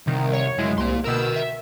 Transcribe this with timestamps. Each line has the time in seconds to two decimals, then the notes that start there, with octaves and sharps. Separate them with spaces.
0.07 C2 D#3
0.33 C#5
0.58 F#2 G#3 E4
0.78 C2 A#3 C6
1.04 B2 A#4 G5 E6 E7
1.35 E5